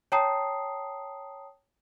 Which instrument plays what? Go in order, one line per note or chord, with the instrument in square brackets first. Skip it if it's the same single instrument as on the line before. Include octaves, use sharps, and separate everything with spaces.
[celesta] C#5 G5 A5 A#5 D#6 C7